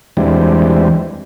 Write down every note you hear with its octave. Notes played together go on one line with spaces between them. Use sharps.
E2 E3 G3 G#3 C4 D4